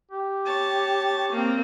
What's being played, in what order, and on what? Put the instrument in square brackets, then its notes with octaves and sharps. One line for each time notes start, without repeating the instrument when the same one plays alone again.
[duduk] G4
[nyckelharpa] C#5 A5
A#3 C4